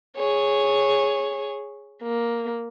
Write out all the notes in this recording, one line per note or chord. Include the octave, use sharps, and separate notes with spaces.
G#4 C#5
A#3